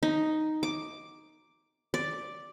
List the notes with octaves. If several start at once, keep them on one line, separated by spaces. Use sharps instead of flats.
D#4
D6
D5